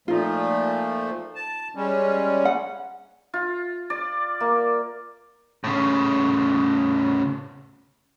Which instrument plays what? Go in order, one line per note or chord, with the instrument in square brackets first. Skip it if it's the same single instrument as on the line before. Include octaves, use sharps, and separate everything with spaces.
[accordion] A#2 F3 A3 [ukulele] D#4 F4
[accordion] A5
G3 G#3 C#4
[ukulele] F#5
[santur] F4
D5
A#3
[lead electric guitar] A2 C#3